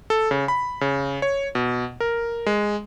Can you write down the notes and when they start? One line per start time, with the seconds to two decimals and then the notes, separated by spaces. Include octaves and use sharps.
0.10 A4
0.31 C#3
0.48 B5
0.81 C#3
1.22 C#5
1.55 B2
2.00 A#4
2.46 G#3